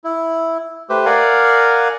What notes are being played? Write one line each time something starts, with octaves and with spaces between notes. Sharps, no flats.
E4
A3 G4 B4 C5
A#4 D5 F5 F#5 G#5